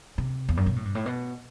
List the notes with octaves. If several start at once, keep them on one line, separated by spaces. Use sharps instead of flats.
C3
E2
F#2
B2
A2
G2
A2
B2